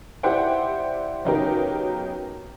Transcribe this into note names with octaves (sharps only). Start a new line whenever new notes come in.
E4 G4 C5 D5 F#5 G5
C#3 F#3 B3 D#4 G4 A#4